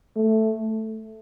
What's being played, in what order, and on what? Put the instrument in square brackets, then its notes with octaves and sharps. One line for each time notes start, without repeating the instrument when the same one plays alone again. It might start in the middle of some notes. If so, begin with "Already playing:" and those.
[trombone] A3